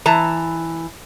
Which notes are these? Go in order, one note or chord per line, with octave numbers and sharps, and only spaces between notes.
E3 A5 A#5